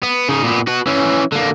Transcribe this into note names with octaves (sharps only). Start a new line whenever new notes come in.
B3
C#3 D#4
A#2 B3
F#4 B4
E3 C#4
D3 A#3